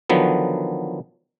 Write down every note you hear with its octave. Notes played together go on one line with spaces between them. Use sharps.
D3 D#3 F3 F#3 B3